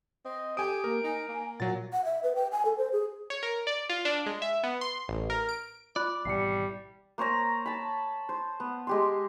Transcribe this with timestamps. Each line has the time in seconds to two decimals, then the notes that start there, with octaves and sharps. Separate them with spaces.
0.25 C4 D#5
0.57 G4 A4 G5 G#5 D#6 D7
0.84 A#3 A#4
1.03 D#4 G#5
1.28 A#3
1.60 A#2 F#3 F#5 A6
1.93 F#5
2.05 E5
2.23 B4
2.35 G5
2.52 G#5
2.65 A4
2.78 C5
2.92 G#4
3.30 C#5
3.43 A#4
3.67 D5
3.89 F4
4.05 D4
4.26 G#3
4.42 E5
4.63 B3
4.81 C6
5.08 A1
5.30 A#4
5.49 D7
5.96 F4 D5 B5 F#6
6.25 G#1 B2 E3 G3 C7 C#7
7.18 A#3 C5 C#5 A#5
7.66 A5 B5
8.29 C5
8.60 B3
8.87 G#3 G4 C6